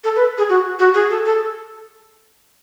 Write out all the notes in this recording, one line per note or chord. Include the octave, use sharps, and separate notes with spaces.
A4
B4
G#4
F#4
F#4
G#4
A4
A4